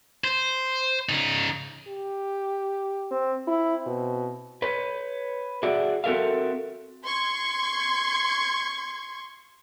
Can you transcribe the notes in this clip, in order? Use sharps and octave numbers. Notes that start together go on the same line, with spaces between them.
C5
C#3 D#4
G4
C4
C4 E4
B2
B4 C#5
F#4 G#4 D5 E5
C4 F#4 A4 A#4 E5 F5
C6 C#6 G#6